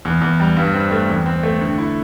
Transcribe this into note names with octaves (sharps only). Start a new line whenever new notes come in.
E2
E2
G3
G2
C4
A3
E2
C4
A3
D3
E4